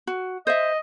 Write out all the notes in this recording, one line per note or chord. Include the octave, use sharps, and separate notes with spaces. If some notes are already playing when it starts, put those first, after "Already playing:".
F#4
C5 D#5 E5